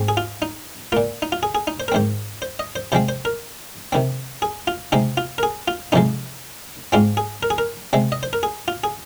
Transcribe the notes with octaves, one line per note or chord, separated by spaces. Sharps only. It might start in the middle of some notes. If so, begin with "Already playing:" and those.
Already playing: G#2 G#3 C4
G#4
F4
D#4
A#2 A#3 F4
D#4
F4
G#4
G#4
D#4
C5
A#4
G#2 D#3 C4 C5
C5
D#5
C5
C3 F3 G#3 C4 C5
C5
A#4
C3 D#3 C4
G#4
F4
C3 G#3 C4 D#4
F4
A#4
G#4
F4
F2 C3 F3 G#3 D#4
G#2 G#3 C4 F4
G#4
A#4
G#4
A#4
C3 G#3 C4
D#5
C5
A#4
G#4
F4
G#4